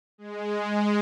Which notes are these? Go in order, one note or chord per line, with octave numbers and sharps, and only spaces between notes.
G#3
G#3